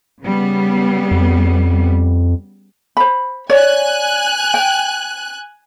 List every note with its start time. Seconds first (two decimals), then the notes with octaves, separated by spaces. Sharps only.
0.23 C#3 G3 B3
1.11 F2
2.97 C5 B5
3.50 C#5 D5 G#5 F#6
4.54 G5